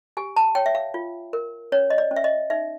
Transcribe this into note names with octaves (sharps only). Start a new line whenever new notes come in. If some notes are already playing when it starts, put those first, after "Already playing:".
G4 G#5
A5
C#5 G5
E5
F5
F4
A#4
C#4 C#5
D#5
D5
C#4
E5
D#5
D#4 E5